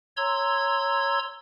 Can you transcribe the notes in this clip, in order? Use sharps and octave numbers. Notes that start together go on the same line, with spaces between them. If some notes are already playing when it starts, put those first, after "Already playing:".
C#5 A#5 C6 E6 G#6